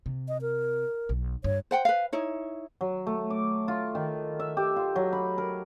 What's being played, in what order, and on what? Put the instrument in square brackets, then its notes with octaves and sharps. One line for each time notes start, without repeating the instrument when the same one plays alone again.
[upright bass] C3
[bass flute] D#5
A#4
[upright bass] B1
[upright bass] G2 [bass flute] C#5
[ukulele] C5 F#5 G5
B4 F5
D#4 E4 C#5
[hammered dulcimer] F#3
A3
D6
F4
D#3
E5
G4
F4
F#3
B5
A#4